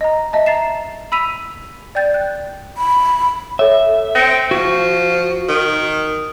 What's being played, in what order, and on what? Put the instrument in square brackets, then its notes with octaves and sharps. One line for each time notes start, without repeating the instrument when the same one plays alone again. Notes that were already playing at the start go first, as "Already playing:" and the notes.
[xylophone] D#5 A#5
D#5 E5 A5
A#5 A6 C7 E7
B5 E6 B6 D#7 F7
D5 G5 G6 A6
F#6
[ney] B5
[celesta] A4 C#5 [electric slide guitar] E5
[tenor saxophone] C4 [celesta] A#6 C#7 D7
[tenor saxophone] F3 [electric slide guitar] F#4
[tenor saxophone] D#3